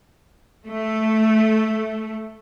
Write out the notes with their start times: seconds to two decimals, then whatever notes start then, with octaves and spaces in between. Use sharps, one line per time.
0.66 A3